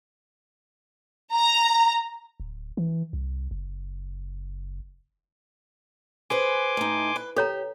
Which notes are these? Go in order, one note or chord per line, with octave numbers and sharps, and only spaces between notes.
A#5
D1
E3
C2
F#1
G#4 B4 C5 G#5 C6 D6
A2 D#4
B4
G4 A4 C#5 A#5